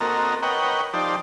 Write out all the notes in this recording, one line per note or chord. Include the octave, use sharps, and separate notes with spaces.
A#3 C4 F#4 A4 A#4 D#5
A#4 B4 C#5 D#5 F#5 G5
F3 D#4 G4 C5 D5 A5